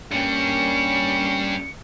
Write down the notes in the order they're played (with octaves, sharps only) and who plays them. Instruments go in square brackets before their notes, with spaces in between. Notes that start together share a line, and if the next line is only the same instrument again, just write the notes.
[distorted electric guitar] G2 G3 [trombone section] A#3 C#4 [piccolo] C#7